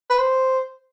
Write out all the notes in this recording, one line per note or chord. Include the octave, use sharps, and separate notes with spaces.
B4
C5